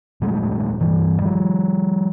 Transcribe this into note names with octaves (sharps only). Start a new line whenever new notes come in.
A#2 F#3 G#3 A3
G2 E3
F3 G3